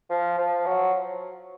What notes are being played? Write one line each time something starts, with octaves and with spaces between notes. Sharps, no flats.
F3
F3
F#3